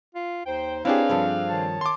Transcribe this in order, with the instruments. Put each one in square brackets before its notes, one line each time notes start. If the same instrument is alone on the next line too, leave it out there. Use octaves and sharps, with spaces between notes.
[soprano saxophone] F4
[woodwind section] D#2 D#4 C5 [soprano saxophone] G5
[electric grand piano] C4 D4 G#4 [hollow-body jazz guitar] E4 G4 [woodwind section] B4 C#5 [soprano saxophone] F5
[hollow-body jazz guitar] G2 F3 A4
[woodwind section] D#3 C#5 A5
[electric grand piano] C6 D6